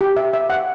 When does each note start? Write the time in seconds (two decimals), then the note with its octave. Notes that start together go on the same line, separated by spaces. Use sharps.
0.01 G4
0.17 E5
0.33 E5
0.50 F#5